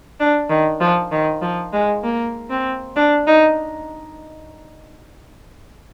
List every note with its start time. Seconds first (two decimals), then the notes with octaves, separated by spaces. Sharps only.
0.20 D4
0.50 D#3
0.81 F3
1.12 D#3
1.42 F3
1.73 G#3
2.04 A#3
2.50 C4
2.96 D4
3.27 D#4